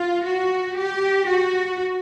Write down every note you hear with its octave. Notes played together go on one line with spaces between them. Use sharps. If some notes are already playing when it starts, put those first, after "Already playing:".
Already playing: F4
F#4
G4
F#4